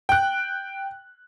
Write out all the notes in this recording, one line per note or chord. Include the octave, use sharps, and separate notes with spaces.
G5 F#6